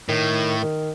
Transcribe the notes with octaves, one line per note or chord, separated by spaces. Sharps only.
A2 D#3
D#3